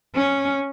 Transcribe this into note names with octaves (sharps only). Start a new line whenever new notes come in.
C#4